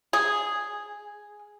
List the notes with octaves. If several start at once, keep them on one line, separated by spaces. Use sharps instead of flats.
G#4